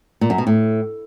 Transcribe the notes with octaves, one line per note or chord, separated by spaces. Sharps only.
A#2
F#2
B2
A2